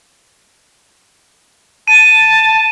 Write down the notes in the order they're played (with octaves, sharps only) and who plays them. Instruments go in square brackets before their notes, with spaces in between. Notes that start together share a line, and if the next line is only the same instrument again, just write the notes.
[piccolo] A5 [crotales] D#7